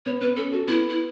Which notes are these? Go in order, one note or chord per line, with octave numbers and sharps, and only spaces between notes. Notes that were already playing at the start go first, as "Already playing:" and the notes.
B3 C#5
B3 B4
C#4 A4
F#4 A4
B3 E4
E4